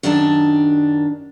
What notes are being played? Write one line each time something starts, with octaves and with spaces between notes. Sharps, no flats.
F#2 D#3 D4 G4 A5